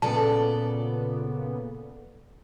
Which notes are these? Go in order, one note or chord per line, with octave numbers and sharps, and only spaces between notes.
A#2 C#3 B3 A4 D5 A5